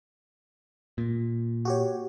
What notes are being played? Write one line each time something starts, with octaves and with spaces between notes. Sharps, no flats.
A#2
F#4 G4 C#5